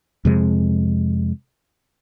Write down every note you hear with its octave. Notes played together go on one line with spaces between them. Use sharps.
F2 C3 G#3